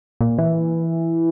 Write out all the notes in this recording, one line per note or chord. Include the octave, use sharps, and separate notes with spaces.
A#2
E3